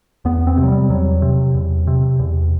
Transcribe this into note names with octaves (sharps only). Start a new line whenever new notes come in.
E2 B3
C4
C3
F#3
G3
E2 F#3
C3
E2
C3
E2